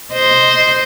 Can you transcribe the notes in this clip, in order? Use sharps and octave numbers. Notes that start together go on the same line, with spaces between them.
C5 D#5